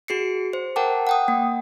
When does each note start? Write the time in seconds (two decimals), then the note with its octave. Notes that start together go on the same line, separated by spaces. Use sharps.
0.08 F#4 G#4 C7 C#7
0.53 C5
0.76 A#4 F#5 G5 A5 D6
1.07 F#5 G5 D#6
1.28 A#3